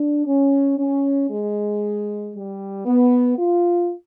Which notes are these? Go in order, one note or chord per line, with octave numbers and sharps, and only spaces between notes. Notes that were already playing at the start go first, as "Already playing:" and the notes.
Already playing: D4
C#4
C#4
G#3
G3
B3
F4